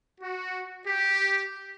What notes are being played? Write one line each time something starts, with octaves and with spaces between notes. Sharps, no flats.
F#4
G4